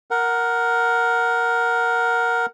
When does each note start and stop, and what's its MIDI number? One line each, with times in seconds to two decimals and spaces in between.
0.11 2.46 70
0.11 2.46 78